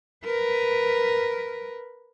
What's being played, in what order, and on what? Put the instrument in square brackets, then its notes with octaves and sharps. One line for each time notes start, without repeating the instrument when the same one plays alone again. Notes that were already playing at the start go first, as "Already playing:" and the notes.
[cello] A#4 B4